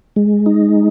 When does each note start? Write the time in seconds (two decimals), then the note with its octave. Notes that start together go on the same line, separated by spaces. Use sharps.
0.16 G#3
0.46 D#4